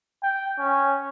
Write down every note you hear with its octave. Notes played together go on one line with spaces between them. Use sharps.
G5
C#4